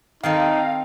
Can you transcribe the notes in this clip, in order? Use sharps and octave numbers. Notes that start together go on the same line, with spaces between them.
D#3 C4 D#4 A4 F5